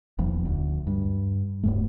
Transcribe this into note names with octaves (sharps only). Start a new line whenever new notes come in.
D#1 E2 F3
D2
G2
D1 G2 A3